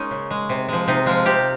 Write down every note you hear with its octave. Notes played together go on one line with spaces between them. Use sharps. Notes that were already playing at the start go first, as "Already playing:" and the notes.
Already playing: G#3 A#3 C#4 D#4
C#3
G#3
C3
F3 G#3
C3 D#4
F3 G#3 F4
C3 G4